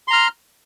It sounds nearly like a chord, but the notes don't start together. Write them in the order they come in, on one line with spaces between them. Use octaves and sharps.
C6 A#5 F6